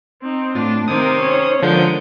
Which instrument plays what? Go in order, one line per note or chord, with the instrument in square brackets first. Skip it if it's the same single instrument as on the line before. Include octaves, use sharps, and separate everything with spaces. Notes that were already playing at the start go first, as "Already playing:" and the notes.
[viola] C4 D#4
[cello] A2 [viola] D4 [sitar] F4
[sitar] C3 D#3 A#3 [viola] C4 A#4 [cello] D#4 C5 [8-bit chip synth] D#6
[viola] C#4 C#5
[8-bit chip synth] D3 F3 G6 [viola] G#3 A#4 [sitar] B3